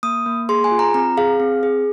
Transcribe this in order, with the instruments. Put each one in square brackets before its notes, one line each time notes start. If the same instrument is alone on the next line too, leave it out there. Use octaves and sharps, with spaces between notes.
[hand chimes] A#3 D#6
A#3
G#4 C6
G#5
F4
A#5
C4 A#5
G#4 F5
C4
G#4